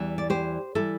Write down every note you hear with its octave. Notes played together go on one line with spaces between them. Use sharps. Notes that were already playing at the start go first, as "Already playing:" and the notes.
Already playing: E2 E3 G3
D5
G4 C5
E3 G3 E4 A4